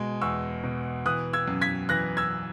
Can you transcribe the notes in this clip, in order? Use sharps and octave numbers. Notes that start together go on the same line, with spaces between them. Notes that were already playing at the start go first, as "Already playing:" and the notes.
Already playing: B2 G#3
E2 C#6 E6
B2
E3 D#6 F#6
E6 G#6
F#2
G#6 B6
E3 F#6 A#6
E6 G#6